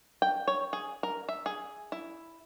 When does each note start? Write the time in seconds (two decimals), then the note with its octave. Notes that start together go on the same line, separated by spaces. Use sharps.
0.22 G5
0.48 C#5
0.73 G#4
1.03 A#4
1.29 E5
1.46 G#4
1.92 E4